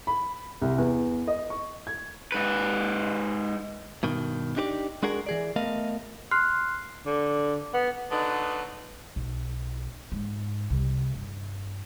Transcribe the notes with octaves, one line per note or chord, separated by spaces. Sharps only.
B5
C2
E2
D#5
C#6
G#6
G#2 B4
G2 B2 D#3
D4 D#4 G4 C5 D5
G#3 D4 F#4 G#4 A#4
E3 G#4 D5
A3 B3 A#4 D#5 F5
C6 F6 F#6 C7
D3
B3
D3 F#3 B3 D#4
B1
G#2
C2
G2